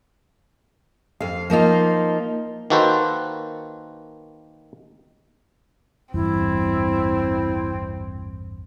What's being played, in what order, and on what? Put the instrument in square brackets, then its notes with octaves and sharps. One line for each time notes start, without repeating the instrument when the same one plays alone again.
[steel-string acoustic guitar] F2 F5
F3 A#3 D#4 F4
[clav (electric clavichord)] D#3 A#3 F#4 A4 B4 C5
[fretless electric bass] A1 E2 G2 [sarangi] C4 [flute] E4